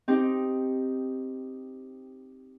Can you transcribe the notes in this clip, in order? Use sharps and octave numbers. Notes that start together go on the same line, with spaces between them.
C4 D#4 G4